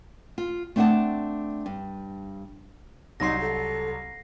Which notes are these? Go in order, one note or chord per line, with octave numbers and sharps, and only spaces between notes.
F4
A3 C4 D4 D#5 F#5 A5
G2
C2 F#3 D#4 C6 A#6 C7
A4